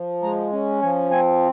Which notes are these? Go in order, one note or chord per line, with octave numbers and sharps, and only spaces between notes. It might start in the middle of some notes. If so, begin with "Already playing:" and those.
Already playing: F3
G#3 A#5
C#4
F3 G#5
C4 G#5